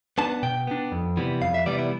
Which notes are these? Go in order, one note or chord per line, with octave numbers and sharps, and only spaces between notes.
B3 D4 A5
B2 G5
B3 D4
F2
C3 E3 G3 B3
F2 F5
E5
C3 E3 G3 B3 D5
E4